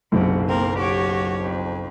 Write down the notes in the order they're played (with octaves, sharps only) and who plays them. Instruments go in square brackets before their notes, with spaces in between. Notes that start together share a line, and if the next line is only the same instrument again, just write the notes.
[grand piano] F#1 B1 [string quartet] C3
[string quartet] A#3 C4 A#4
F#4 G4 C#5
F2